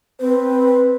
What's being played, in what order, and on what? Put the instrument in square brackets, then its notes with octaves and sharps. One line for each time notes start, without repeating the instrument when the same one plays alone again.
[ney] C4 [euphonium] B4